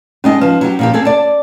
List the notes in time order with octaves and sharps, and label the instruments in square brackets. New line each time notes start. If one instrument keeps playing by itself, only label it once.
[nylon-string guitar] G3 G#3 D#5 [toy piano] C#4 D#4
[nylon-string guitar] F3 [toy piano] B4
[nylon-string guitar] F#3 G4
A#2 F3 G4
C4 G#4 A4
D5 A5